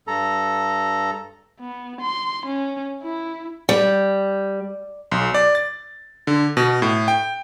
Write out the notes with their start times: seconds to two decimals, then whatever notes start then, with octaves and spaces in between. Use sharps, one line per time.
0.07 G2 A4 A#5
1.60 B3
2.01 C6
2.46 C#4
3.03 E4
3.69 G3
5.11 B1
5.34 D5
5.55 A6
6.27 D3
6.57 B2
6.82 A2
7.08 G5